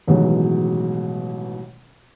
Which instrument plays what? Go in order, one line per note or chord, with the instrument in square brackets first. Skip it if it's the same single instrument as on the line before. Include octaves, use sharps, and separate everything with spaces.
[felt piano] A1 B2 D#3 E3 F#3 G#3